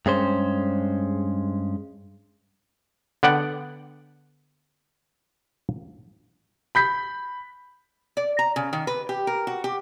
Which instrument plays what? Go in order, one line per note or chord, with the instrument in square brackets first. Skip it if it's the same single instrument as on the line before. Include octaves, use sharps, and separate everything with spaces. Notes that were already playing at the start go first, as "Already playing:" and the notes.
[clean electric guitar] G2 G#3 C#4 C5
[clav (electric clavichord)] D3 B3 D5 F#5 G5
[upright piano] B5 G6 B6
[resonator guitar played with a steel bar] D5
A#5
C#3
D#3
B4
G4
A#4
F#4
G4